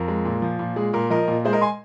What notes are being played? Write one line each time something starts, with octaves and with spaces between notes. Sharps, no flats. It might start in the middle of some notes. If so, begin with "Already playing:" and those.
Already playing: F2 A#4
G#3
A#2
F3
A#2
G#3 G#4
A#2 A#4
F3 A#4 D#5
A#2
G#3 G#4 C5
A#4 D#5
G#5 C6